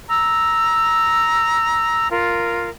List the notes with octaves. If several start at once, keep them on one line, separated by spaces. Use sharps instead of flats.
A#5 E6
F4 A#4